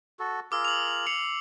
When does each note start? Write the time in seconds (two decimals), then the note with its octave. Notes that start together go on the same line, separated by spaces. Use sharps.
0.19 F#4 A4
0.52 F4 G#4 A#4 D6 E6
0.65 F7 F#7
1.06 C7 C#7 F7